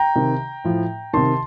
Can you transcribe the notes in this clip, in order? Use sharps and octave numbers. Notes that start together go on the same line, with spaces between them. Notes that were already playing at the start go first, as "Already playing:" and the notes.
Already playing: G5 A#5
C3 D#3
A2 F3
C3 D#3 A5 C6